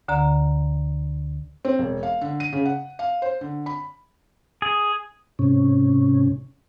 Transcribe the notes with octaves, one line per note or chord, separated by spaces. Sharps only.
D2 D3 D5 A#5
C4
E1
F5
D3
D#7
C#3
F#5
F5
C5
D3
B5
G#4
G#2 C3 C#4